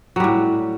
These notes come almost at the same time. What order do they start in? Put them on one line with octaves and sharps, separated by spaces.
F#3 G3 A2